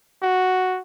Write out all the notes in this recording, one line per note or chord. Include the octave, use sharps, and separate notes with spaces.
F#4